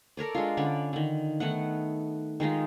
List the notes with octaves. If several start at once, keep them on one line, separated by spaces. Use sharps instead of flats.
A4 A#4 C#5 D5
G#3 D4 F4
D3 C#4 D5 B5
D3 D#3
D#3 A3 B3 F#5
D#3 G#3 D#4 F4